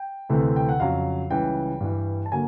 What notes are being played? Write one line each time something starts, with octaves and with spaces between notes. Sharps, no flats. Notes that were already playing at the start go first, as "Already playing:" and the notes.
Already playing: G5
D2 C3 E3 A3 C4
G5
F#5
F2 C#3 F#3 F5
C#2 C#3 E3 G3 G5
G2 E3 G3
A5
D3 F#3 A#3 G#5